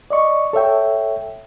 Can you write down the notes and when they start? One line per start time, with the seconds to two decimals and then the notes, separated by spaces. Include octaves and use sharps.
0.10 D5 D#5 C#6
0.53 A4 C#5 E5 G5